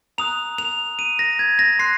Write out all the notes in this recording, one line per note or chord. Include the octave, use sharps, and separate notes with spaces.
A#5 D#6 F#6 F7
F7
D#7
A#6
G#6
A#6
C6 F#6 C7